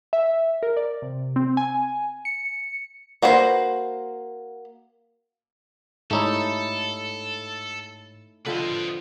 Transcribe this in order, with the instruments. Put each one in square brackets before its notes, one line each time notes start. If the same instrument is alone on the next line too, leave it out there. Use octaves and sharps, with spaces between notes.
[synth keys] E5
A#4
D5
C3
C4
G#5
C#7
[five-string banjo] A#3 F#4 B4 C5
[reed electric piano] G#2 C#5 [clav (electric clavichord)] A3 D#4 E4 [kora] G4 [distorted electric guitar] A4
[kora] D3 F3 C4 [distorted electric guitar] B4 D#5